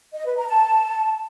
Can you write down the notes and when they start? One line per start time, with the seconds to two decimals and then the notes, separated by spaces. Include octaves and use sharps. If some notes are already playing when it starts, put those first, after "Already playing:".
0.14 D#5
0.26 B4
0.37 A#5
0.49 A5